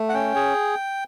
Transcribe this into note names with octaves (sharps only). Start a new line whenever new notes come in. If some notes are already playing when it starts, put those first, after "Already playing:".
Already playing: A3
F#5
C#4 G5
G#4